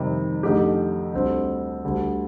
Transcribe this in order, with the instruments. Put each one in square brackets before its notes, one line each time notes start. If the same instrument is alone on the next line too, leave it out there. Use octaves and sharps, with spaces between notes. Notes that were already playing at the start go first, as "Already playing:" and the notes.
Already playing: [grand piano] F2 C3 D#3 G3
F2 D3 A3 D#4 G4
D2 D3 G3 C4
D2 D3 G3